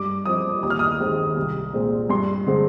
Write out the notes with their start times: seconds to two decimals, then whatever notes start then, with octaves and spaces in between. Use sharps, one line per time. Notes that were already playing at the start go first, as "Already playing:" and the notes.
Already playing: G2 D6
0.26 F3 C4 D#6
0.63 D#2 D#6
0.70 F6
0.79 D#6
0.99 D#3 G#3 C4
1.37 C2
1.73 A#2 G#3 C4
2.10 G2 C6
2.47 D3 G#3 C4